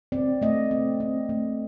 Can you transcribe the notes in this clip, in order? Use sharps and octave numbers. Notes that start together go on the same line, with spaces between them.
C4 D5
A3 D#5
C4
C4
A3